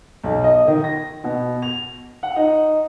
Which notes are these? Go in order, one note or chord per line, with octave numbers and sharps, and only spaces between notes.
B1
D#5
D#3
A#6
B2
F7
F#5
D#4